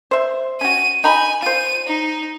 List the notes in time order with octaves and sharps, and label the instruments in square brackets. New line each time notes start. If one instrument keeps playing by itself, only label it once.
[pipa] C5 E5
[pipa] C#4 F#4 [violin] D#7
[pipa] D#4 A#5 B5 [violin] G#5
[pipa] F4 C5 [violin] D#7
[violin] D#4